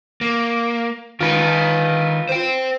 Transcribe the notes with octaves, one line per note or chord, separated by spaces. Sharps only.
A#3
D#3 F4 B4
C5 G5